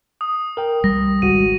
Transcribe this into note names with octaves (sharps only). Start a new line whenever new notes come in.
D#6
A#4 G5
C2 G3 A#6
G#1 C#2 F#4 D#7